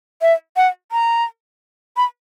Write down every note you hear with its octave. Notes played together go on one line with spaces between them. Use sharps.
E5
F#5
A#5
B5